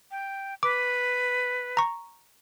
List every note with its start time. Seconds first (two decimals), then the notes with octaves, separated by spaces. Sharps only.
0.11 G5
0.63 B4 D6
1.77 A#5 C#6